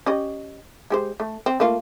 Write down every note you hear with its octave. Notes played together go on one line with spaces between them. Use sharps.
C#4 G4 D#5
G#3 G4 C5
A3
C4
A3 A#3 F4